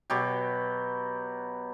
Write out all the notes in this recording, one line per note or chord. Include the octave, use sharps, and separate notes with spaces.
B2 F#3 G4